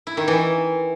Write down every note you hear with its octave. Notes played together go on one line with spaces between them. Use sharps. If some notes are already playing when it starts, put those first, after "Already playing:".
E4
D#3
E3